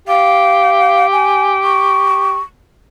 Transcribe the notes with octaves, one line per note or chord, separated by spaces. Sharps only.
G4 F5
G#5
C#6